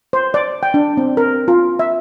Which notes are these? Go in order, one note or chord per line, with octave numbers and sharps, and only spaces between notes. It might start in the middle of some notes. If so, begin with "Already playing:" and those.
C5
D5
G5
D4
C4
A#4
F4
E5